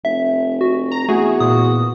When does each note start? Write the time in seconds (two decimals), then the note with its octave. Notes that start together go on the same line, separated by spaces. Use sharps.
0.05 F1 E5
0.61 F#4
0.92 A#5
1.09 E2 A3 F#4 G#4
1.40 A#2 D#6